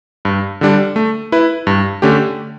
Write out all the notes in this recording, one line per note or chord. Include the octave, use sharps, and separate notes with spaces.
G2
D3 G3 D4
A3
E4 B4
G2
D3 A3 C#4 G4